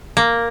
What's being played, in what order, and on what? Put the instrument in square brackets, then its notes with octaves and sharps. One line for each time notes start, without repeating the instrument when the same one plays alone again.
[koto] A#3